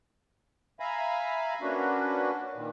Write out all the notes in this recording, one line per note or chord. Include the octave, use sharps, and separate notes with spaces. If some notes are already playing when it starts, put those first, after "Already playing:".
E5 F5 G#5 A#5 B5
A#3 C#4 D4 F#4 B4
A#2 D#3